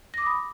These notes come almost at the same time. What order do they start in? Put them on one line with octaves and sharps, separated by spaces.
A#6 D6 D#6 B5